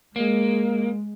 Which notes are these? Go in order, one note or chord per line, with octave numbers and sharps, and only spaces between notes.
G#3 A#3